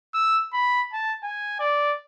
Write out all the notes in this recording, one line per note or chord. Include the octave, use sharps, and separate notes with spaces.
E6
B5
A5
G#5
D5